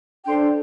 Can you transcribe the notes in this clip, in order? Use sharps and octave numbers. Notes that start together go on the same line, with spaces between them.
D4 A4 C5 G5 C6